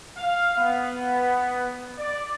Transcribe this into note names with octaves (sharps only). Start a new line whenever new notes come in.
F5
B3
D5